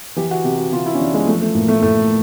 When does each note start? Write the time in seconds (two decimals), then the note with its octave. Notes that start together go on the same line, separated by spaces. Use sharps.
0.16 E3 G4
0.31 F#4
0.44 C3 G4
0.58 F#4
0.72 C3 F4
0.86 E4
0.95 C#4
0.99 E3 D4
1.14 G#3
1.27 F3 A3
1.42 A3
1.55 A2 A#3
1.68 A3
1.82 A2 A3